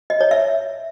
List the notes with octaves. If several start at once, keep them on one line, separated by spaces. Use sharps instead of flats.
D#5
C#5
E5